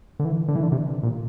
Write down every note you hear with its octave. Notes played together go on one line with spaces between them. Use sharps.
D3
E3
D3
E3
D3
C3
A#2